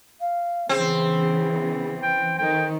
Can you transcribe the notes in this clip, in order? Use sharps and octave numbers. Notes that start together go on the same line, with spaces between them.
F5
C#3 E3 B3 C4 G#4
G5
D#3 A4 G5